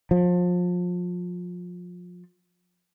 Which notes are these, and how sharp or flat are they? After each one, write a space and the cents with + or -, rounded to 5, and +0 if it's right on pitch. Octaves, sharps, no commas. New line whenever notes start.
F3 +30